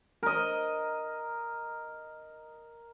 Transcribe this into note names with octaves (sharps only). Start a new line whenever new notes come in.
A#4 D#5